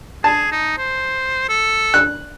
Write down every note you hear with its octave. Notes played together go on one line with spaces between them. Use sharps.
G#4 A5
D#4
C5
A4
F#6